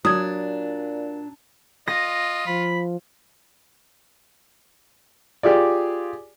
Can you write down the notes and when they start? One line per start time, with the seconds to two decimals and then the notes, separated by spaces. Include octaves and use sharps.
0.05 A#2 F#3 D4 D#6 G#6
1.88 F4 D#5 A#6
2.47 F3 B5
5.43 F4 G4 G#4 D5